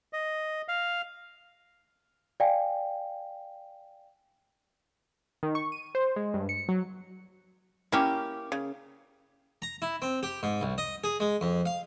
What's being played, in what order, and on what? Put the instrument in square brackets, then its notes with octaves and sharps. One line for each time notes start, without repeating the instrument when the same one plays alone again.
[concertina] D#5
F5
[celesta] D5 F5 G5 G#5
[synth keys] D#3
C#6
D#7
C5
G#3
G2
C#7
F#3
[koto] A#3 C#4 [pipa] E4 G4
[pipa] C#3
[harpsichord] A#5
E4
C4
G4
G#2
C2
D#5
G#4
G#3
F2
F5